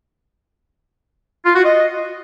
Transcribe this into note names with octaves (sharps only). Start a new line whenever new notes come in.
F4
F#4
D#5